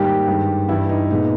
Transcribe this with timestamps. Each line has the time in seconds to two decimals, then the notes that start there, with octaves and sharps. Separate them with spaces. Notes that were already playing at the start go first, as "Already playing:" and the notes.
Already playing: G#2 D#3 G3 A#3 G4
0.27 G2 D#3 G#3
0.68 G2 E3 G3 E4
0.89 D#4
1.11 A#2 G#3 B3 D#4